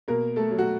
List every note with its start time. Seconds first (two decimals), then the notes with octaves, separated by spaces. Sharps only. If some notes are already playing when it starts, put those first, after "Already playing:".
0.08 B2 A#3 A#4
0.36 A3 A4
0.51 F#3
0.58 F#4